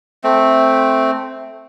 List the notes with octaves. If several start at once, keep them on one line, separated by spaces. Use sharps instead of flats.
A3 C4